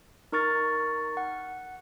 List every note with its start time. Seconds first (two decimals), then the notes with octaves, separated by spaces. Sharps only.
0.32 D#4 A#4 C#6 F6 A6
1.17 F#5